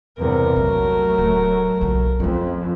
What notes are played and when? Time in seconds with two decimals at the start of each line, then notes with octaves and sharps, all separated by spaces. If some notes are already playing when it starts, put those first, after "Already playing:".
0.18 E2 G2 C3 A#4
0.56 A#1 F#3 A3
1.18 D1
1.81 B1 A#2
2.20 F2 C#4 E4